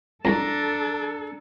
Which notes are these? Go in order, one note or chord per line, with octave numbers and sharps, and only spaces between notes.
C2 F2 D4 A4 A#5